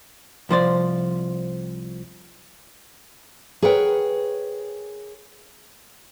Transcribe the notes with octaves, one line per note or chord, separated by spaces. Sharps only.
C2 F3 C5 D5
G#4 A#4 B4 C#5 F#5 G5